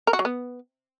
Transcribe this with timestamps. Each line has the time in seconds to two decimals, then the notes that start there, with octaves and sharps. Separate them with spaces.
0.07 A#4
0.13 F#4
0.19 F#3
0.25 B3